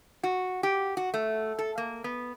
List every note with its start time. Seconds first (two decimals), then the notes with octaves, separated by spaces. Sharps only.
0.23 F#4
0.63 G4
0.97 F#4
1.14 A3
1.59 A4
1.78 A#3
2.04 B3